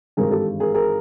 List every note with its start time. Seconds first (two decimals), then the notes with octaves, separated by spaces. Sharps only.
0.17 G#1 G2 E3 G#3 G#4 A#4
0.31 G4 A4
0.60 G#4 A#4
0.74 G#4 A#4